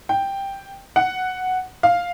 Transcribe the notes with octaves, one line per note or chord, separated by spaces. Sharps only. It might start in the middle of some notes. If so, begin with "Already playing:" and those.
G5
F#5
F5